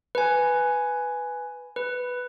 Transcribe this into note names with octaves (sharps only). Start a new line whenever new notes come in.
B4 G#5
B4